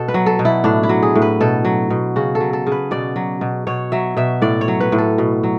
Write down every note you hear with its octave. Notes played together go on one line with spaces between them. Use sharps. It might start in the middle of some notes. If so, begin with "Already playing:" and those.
Already playing: B2 A4
B4
F#3
A4
B2
E4
A2 D4
E4
F#3
G#4
A2
B4
B2 A4
F#3
B2
C#3 F#4
A4
F#3
A4
C#3
B4
B2 D5
F#3
B2
B2 C#5
F#3 E5
B2 E5
A2 D5
C#5
F#3
B4
A2
A4
B2
F#3